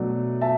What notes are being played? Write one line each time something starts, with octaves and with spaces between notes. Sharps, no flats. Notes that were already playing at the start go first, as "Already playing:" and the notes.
Already playing: B2 F#3 A3 D4
E5 A5